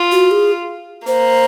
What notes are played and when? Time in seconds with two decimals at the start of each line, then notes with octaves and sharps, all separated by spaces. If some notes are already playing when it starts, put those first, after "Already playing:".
Already playing: F4
0.12 F#4
0.31 G#4
1.06 A#3 C5